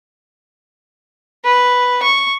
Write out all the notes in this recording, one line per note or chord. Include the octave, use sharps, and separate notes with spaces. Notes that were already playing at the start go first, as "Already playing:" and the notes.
B4
C#6